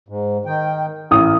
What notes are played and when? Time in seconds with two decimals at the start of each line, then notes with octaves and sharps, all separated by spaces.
0.09 G#2
0.46 D#3 G5
1.11 A1 A#4 D#6